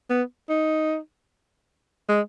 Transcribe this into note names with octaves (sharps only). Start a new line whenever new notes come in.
B3
D#4
G#3